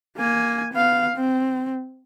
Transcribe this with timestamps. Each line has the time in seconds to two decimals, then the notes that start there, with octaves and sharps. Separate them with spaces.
0.17 A#3 G#5
0.74 B3 F5
1.16 C4